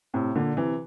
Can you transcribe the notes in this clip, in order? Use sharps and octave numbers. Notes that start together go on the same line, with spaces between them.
A2 C3
A#2 D3
C3 E3